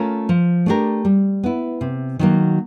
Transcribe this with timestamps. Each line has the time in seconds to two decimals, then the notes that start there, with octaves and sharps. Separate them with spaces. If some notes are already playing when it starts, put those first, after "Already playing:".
Already playing: A3 C#4 F4 A#4
0.29 F3
0.66 A3 D4 G4 A#4
1.05 G3
1.43 B3 E4
1.81 C3
2.19 D#3 F#3 A#3